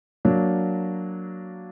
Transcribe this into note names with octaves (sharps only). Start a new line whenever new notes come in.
F#3 A#3 D4